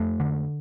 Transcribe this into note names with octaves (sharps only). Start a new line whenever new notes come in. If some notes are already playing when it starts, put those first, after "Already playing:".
Already playing: F2 A3
D3